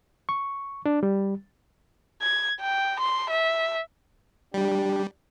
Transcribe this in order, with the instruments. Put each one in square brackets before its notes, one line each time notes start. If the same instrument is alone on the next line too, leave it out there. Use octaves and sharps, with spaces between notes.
[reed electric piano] C#6
D4
G3
[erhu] G#6
G5
C6
E5
[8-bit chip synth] G3 [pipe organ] D4 G4